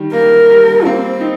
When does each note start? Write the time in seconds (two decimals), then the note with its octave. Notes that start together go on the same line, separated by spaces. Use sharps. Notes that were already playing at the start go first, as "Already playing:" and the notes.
Already playing: D#3 G3
0.13 A#3 A#4
0.49 G3
0.85 A#3 C4
1.21 D#4